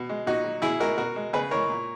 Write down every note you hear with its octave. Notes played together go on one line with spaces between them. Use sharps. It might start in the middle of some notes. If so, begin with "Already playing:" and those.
Already playing: B2
G#3
A#2 D#4 F#4
F#3
B2 E4 G#4
G#3 F#4 A#4
B2 F#4 A#4
G#3
C#3 G#4 B4
E3 G#3 A#4 C#5
A#2